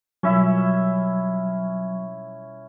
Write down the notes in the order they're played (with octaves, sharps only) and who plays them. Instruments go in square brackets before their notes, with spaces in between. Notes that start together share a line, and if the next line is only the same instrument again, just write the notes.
[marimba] B2 G3 F4 [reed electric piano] F#3 [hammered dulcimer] C#4 E4 E5